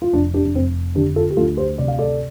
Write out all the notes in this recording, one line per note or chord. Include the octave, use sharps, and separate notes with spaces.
F4
F1 D4
D4 G4
D4
F1 C4
D3 D4 G4
F4 A4
G4
D2 F4 A4
G4 C5
C3 D5
F5
A4 D5